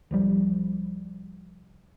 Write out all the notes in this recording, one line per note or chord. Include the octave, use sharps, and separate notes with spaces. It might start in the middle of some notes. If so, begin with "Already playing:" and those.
C2 F3 G3